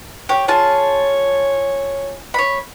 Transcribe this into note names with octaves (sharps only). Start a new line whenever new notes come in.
G4 C#5
F4 G#4 C#5 A5
C#5 B5